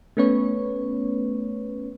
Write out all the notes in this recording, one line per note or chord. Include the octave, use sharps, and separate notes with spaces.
A3 B3 C#4 B4 C#5